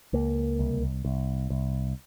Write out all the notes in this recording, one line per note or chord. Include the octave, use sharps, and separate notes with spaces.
C#2 A#3
C2
C2
C2